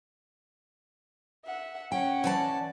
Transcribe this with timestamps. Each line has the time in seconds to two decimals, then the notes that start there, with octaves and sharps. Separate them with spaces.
1.46 E5 F#5
1.92 C#4 F#5 G5
2.24 E3 D5 A5